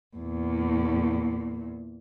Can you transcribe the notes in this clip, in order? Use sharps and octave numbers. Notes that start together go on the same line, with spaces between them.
E2 A#2